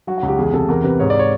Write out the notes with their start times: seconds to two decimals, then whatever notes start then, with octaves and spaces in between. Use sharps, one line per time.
0.07 F#3 F#4
0.18 F#4
0.23 C#2
0.28 G4
0.38 E2 G#4
0.53 C3 A4
0.68 E2 A#4
0.84 C3 B4
1.00 G#2 C#5
1.10 D5
1.19 C#5